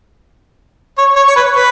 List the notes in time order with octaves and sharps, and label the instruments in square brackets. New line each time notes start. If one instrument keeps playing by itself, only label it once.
[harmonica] C#5
C#5
C#5
B4
B4